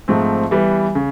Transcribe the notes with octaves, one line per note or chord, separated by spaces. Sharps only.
G#2 F3 A3 C4
E3 G3 B3
C#3